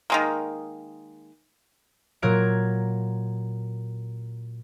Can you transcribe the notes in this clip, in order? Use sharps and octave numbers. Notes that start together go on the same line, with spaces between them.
D#3 G#3 A#3
A#2 F#3 A#4 G#6 D7